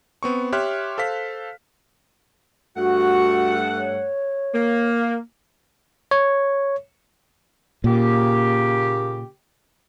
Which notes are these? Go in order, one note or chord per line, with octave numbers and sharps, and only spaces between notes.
B3 C4 C#6
G4 C#5 E5 C6 F6 F#6
A4 C5 F5 B6
G2 A3 F#4 F#5
C#5
A#3
C#5
A#2 C#3 A#3 G4